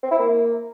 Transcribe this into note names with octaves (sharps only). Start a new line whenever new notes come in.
C4
E4
A#3